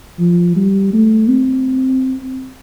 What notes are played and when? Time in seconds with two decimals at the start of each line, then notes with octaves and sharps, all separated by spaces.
0.19 F3
0.56 G3
0.93 A3
1.29 C4